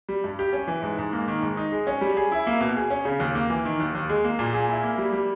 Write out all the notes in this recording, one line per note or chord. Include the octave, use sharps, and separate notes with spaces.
G3
G2
G4
C#4
E3
G#2
G#2
A#3
D#3
G#2
D#4
G#3
C#4
G3
G#4
E4
A#3
B2
G#4
C#4
C#3
D#2
A#3
E3
D#3
D#2
D#2
G#3
A#3
A#2
G#4
E4
A#3
G3
G3